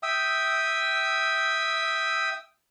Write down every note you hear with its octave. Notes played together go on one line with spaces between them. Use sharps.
E5 G5 D#6 E6